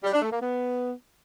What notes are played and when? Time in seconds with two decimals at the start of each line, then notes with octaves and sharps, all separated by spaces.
0.04 G3
0.13 D4
0.22 A3
0.31 A#3
0.41 B3